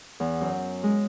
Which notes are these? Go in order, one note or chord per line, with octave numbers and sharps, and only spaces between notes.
E2
F#2
G#3